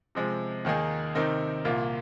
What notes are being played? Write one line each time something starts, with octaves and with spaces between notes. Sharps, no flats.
C3 F3 G#3
D#2 D#3 A#3 D#4 G#4
C3 D#3 C4 D#4 A#4
C2 A#2 A#3 F4